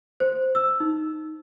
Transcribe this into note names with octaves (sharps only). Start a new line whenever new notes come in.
C5
E6
D#4